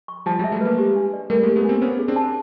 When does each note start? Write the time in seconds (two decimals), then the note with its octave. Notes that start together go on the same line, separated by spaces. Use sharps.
0.08 C#6
0.26 F3 G3 A5
0.39 F#3 G#3
0.44 E5
0.52 G3 A3
0.61 G#3 A#3 B4
0.78 G4
0.96 D4
1.13 D5
1.30 G3 A3 A#4
1.43 G#3 A#3
1.47 G4
1.56 A3 B3
1.64 A#3 C4 D4
1.82 B3 C#4 C5
1.99 G#4
2.08 C4 D4
2.16 A5